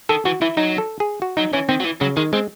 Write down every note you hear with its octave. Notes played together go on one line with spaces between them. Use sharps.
D#3 A4
E3 F#4
E3 E4
F#3 D#4
A4
G#4
F#4
F#3 D#4
E3 C#4
D#3 C4
F#3
E3
C#3 F#3
D#3 G#3
G#3 C4